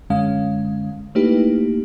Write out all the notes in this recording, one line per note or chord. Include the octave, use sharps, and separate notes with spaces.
F#2 D3 G#3 C#4 F5
A3 A#3 D#4 E4 G4 B4